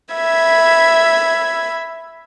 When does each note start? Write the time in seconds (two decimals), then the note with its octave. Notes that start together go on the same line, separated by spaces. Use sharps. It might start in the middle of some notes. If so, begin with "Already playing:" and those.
0.14 E5 B5 G#6